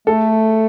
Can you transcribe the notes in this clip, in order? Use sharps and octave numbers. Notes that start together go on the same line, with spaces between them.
A3 A4